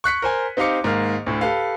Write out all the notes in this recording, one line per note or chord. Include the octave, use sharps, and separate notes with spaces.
C#6 F#6 B6 C#7
A#4 C5 G#5
C4 D#4 G4 F5 D6 C#7
G#2 D#3 A#3 F6
D2 A2
G4 A4 B4 F5